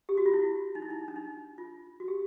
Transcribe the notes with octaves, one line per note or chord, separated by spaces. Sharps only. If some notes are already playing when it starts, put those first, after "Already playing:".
G4
F#4
F4
E4
D#4
E4
D#4
D4
D#4
F4
F#4
G4